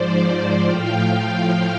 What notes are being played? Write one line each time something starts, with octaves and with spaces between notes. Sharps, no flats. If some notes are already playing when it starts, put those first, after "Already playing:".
Already playing: G#2 F3 C5 D5
A2 F3 F5 G5